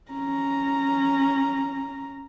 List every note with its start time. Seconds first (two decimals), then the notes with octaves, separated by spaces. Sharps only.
0.11 C#4 A#5